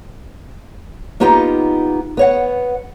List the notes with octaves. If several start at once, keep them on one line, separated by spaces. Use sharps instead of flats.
A#3 B3 D#4 F4 G4
B3 C#5 F#5